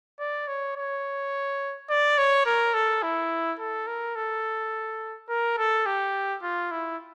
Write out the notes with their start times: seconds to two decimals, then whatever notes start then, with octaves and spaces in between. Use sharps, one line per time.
0.20 D5
0.48 C#5
0.77 C#5
1.90 D5
2.18 C#5
2.46 A#4
2.74 A4
3.03 E4
3.59 A4
3.87 A#4
4.16 A4
5.29 A#4
5.58 A4
5.86 G4
6.43 F4
6.72 E4